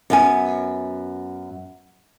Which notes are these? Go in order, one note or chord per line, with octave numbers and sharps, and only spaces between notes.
F#2 B3 G#5